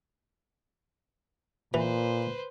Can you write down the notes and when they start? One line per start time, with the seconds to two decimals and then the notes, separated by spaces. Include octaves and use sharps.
1.74 A#2 E3 B4 C5